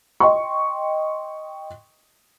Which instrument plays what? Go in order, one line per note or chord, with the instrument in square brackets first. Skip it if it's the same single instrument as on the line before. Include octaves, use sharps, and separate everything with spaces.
[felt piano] D#5 G5 C6 C#6